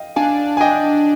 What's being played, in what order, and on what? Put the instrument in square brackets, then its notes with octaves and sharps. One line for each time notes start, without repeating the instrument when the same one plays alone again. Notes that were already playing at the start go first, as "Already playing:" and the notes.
Already playing: [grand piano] D#5 F5 G5
[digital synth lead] D4 [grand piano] F5 G#5
[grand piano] G#5
D#5 G5